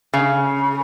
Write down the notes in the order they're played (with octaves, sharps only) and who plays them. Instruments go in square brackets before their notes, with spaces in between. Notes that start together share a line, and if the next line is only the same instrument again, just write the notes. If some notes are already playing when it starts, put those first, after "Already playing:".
[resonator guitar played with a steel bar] C#3